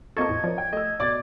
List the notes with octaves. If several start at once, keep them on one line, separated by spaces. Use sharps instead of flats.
A#3 C4 F4 A4 D#5 A5 C#6 G#6
E2 A2
F3 A#4 C#5 D5
G5
A3 D#5 E6
B2 D5 D6 A6